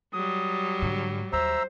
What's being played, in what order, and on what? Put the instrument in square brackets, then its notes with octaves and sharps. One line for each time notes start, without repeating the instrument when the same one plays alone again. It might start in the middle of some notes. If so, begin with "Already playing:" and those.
[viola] F#3 G3 [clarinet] D#6
[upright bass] G#2 D3
[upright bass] D#2 [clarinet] C5 [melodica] E5 A#5 E6